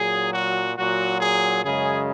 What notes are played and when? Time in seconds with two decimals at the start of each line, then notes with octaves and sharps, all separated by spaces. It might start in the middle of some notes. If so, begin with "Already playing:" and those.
Already playing: A#2 F#3 G#4
0.33 F#4
0.76 A#2 F#3 F#4
1.20 G#4
1.62 F#2 C#3 G#3 G#4